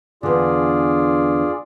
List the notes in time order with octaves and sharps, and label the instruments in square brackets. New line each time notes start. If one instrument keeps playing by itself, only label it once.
[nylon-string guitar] E2 D3 [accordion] F4 G#4 D5